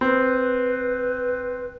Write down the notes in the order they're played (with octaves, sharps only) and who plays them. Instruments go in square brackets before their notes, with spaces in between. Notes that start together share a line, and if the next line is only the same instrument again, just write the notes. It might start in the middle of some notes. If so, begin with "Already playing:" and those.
[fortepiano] C4 [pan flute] B4